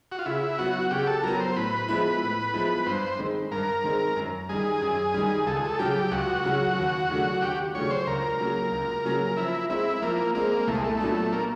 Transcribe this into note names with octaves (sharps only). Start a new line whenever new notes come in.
F#4
F4
C#3 E4
F#3 B3 F#4
C#3 G4
A4
F#3 B3 A#4
C5
A2 B4
F3 G#3 B3 E4
A2
F3 G#3 B3 E4
G2 C5
D#3 G#3 C4
G2 A#4
D#3 G#3 C4
F#2
D#3 G3 G#4
F#2
D#3 G3
C#2 A4
G#4
A4
C#3 F#3 G4
C#2 F#4
C#3 F#3
D#2
C#3 F#3 A3 D4
D#2 G4
C#3 F#3 A3 D4 C#5
C5
C#2 A#4
C#3 F#3 A#3 C#4
C#2
C#3 F#3 A#3 C#4
F3 E4
G#3 C4 E4
F3 A#3
G#3 A#3 C4
C2 A3
G#3
A3
A#2 F#3 B3 D4
A#3